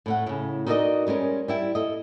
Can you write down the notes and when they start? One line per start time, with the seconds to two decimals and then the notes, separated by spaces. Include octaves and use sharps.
0.06 A2 A3 F#5
0.26 A2 C#3
0.66 D#4 F#4 A4 A#4 D5 D#5
1.07 G3 G#3 C#4 A#4
1.48 G3 E4 G5
1.75 A4 D#5